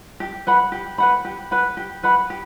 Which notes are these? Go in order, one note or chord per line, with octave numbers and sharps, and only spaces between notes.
G4
B4 F#5 B5
G4
B4 F#5 B5
G4
B4 F#5 B5
G4
B4 F#5 B5
G4